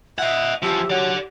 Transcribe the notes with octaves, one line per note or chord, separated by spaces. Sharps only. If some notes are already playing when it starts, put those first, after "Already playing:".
D#5 E5 F#5
E2 F3 G4 E5
F#3 D5 F#5